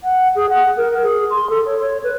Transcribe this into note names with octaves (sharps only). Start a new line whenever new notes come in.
F#5
G#4
F#5
A#4
G#4
C6
A4
C#5
C#5
B4